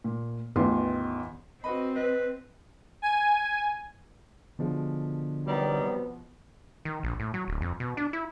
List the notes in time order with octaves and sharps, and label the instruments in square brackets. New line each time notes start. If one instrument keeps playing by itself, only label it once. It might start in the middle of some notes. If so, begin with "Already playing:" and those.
[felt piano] A#2
A1 E2 D#3 F4 C6
[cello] C4 [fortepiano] F#4 B4 B5 [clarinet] D#5
[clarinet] B4 [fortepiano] D#5
[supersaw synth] G#5
[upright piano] B2 F3 G#3 [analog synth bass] D3
[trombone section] C3 B3 [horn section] D#3 F#3 G3
[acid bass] D#3
A#1
A2
F#3
D1
F2
B2
D4
E4